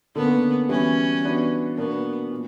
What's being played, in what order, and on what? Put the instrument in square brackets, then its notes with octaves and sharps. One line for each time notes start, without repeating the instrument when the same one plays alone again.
[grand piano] D3 A#3 C#4 [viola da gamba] B3
[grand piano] E3 G3 B3 F#4 [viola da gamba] C#4
[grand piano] E3 B3 D4 F#4
[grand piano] B2 A#3 D4 F#4 A#4 [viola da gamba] B3
[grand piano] A#2